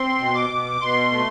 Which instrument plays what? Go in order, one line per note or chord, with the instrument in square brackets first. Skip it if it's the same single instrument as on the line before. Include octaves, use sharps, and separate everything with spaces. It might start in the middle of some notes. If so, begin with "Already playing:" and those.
Already playing: [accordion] C4 C6
B2
D6
B2
B2 C6
A3